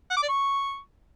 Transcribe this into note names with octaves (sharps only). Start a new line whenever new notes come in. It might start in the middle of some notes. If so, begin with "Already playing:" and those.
F#5
D6
D5
C#6